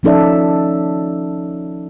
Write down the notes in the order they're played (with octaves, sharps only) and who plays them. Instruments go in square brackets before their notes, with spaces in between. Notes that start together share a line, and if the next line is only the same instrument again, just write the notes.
[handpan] F3 C#4 D#4 A4 D5 E5